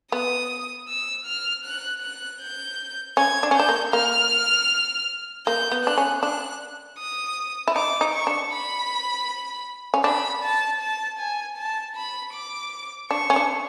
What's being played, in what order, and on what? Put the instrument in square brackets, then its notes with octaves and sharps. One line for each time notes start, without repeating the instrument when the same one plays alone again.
[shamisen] B3 [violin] D#6
[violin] E6
F6
F#6
F#6
G6
[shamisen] C#4 [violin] G#6
[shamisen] D4
C#4
[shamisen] D4 [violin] G6
[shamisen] A#3
[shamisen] A#3 [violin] F6
[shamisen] A#3 [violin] G6
[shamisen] B3
[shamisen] D4 [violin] F#6
[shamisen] C#4
[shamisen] D4 [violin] F#6
[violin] D#6
[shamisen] E4
[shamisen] D#4 [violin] D6
[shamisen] D#4
[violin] C#6
[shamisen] D4
[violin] B5
[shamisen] C#4
[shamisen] D4 [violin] B5
[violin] A5
A5
G#5
A5
B5
D6
[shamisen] D4 [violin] C#6
[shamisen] C#4
D4